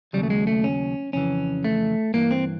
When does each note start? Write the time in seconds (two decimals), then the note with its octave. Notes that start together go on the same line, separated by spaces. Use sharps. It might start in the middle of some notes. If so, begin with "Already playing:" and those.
0.13 D#2 C#3 F#3 G3
0.23 A3
0.30 G#3
0.47 A3
0.64 C#4
1.13 F2 C#3 E3 C#4
1.64 A3
2.14 G2 E3 A#3
2.31 C4